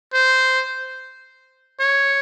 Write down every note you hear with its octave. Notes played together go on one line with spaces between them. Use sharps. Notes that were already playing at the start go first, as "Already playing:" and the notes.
C5
C#5